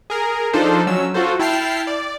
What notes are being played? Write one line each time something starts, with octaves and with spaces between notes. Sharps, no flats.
G#4 A#4
F3 D4 D#4 F4 A4 C5
F#3 C#4 E6
F4 F#4 A4 C5
E4 G5 A5 F6 C7
D5